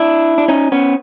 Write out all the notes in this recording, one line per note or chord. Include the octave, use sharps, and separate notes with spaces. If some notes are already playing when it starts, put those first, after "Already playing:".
Already playing: D4 E4
D4
C#4 D#4
B3 C#4